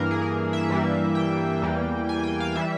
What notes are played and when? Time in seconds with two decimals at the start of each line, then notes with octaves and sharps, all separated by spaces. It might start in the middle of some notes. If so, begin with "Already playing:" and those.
Already playing: G2 E3 A#3 A#4
0.11 G#4
0.22 A#4
0.53 E5
0.70 G2 E3 G3 A#3
1.15 G5
1.62 E2 E3 G3 A#3
2.09 G#5
2.24 G5
2.40 F5
2.56 E3 G3 E5